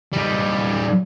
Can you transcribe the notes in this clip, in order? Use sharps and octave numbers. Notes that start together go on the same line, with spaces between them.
G3 D#4